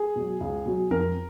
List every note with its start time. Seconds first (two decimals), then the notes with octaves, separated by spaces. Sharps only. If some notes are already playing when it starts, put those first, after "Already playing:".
Already playing: G#4
0.16 B2 F#3
0.41 C#2
0.66 B2 F#3
0.91 F2 A#4